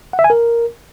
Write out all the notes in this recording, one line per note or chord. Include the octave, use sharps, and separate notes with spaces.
F#5
E5
G#5
A#4